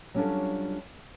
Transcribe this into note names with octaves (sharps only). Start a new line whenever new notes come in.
F#3 G3 C#4 D4 F4 A4